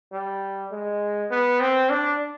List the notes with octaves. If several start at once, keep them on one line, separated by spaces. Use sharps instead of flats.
G3
G#3
B3
C4
D4